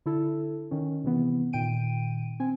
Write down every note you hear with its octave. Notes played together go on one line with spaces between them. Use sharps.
D3 E4 A4
D#3 C#4
C3 E3 B3
A#2 D#3 G5 D7 D#7
C4 G#5